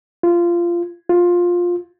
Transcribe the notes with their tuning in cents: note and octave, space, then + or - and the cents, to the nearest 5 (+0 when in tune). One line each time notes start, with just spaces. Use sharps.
F4 -20
F4 +10